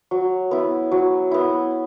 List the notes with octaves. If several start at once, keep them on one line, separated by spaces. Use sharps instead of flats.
F#3
B3 E4
F#3
B3 E4